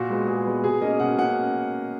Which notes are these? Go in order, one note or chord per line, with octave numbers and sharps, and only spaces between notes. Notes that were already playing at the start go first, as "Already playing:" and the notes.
Already playing: A#2 F#4
G#3 B3
A#2 G#4
G#3 B3
B2 G#4
A#3 C#4 D#5
B2 F#5
A#3 C#4 F#5